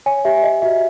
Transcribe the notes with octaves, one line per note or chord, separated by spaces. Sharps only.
C#5 G#5
G4 E5
G4 D#5
F#4 E5